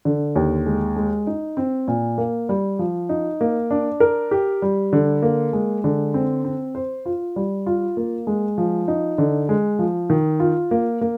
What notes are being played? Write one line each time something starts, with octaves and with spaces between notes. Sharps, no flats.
D3
D#2
G#3
G#3
D#4
C4
A#2
A#3
G3
F3
D#4
A#3
D4
A#4
G4
G3
D3
A#3
G#3
D3
C4
C4
C5
F4
G3
F4
A#3
G#3
F3
D#4
D3
G#3
F3
D#3
F4
A#3
A#3